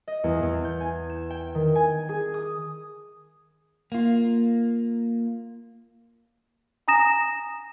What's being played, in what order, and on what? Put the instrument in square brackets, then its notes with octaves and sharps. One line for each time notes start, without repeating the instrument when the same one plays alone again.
[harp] D#5
E2
E2
G6
G#5
E7
G5
D#3
G#5
G#4
D#6
[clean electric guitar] A#3 F4
[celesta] G#5 A#5 D#6 A#6 E7